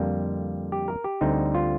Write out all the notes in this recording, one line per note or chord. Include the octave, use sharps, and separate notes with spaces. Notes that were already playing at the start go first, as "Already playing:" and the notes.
Already playing: F2 D3 G3 A#3
G4
A#4
G4
D2 D3 G3 C4 D#4
F4